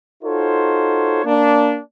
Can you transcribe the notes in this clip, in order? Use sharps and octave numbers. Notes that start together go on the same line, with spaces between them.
D#4 F4 F#4 A4 C5 C#5
A#3 D4